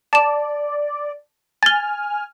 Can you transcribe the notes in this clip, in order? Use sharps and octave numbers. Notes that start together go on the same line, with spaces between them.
D5 A5 E7
G#5 F6 A6 G7